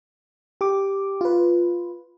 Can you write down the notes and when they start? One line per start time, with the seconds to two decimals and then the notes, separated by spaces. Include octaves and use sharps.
0.61 G4 D6
1.21 F4 B4